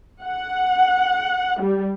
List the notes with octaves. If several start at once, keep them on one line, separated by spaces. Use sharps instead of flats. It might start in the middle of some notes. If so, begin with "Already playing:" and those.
F#5
G3